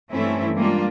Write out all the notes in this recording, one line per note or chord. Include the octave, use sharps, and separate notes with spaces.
G2 E3 A3 C4 C#4 E4
G3 G#3 A#3 D4 F4